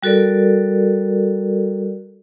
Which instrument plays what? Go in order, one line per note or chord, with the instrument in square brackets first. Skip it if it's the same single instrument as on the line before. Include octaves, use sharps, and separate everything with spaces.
[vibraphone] G3 F#4 A4 A#4 D5